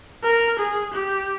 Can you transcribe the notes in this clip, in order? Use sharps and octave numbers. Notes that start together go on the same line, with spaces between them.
A#4
G#4
G4